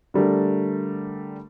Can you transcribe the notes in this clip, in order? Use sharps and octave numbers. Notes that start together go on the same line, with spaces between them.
D3 G3 A3 A#4